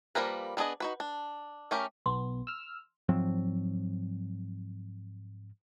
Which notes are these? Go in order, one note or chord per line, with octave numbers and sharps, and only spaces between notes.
F3 G3 A#3 A#4 B4
G3 B3 D4 G#4 D#5
D#4 F#4 B4
D4
A3 C#4 G4 A#4
B1 B3 C6
E6 F6
G#2 F3 F#3 C4